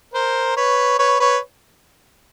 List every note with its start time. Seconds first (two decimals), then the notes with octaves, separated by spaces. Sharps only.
0.14 A#4 C5
0.57 B4 C#5
0.99 B4 C#5
1.20 B4 C#5